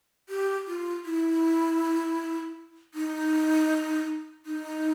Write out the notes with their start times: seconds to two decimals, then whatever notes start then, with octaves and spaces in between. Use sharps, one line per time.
0.29 G4
0.67 F4
1.05 E4
2.94 D#4
4.46 D#4